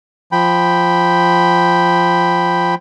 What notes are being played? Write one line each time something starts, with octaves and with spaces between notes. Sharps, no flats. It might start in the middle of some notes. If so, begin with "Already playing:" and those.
F3 G5 B5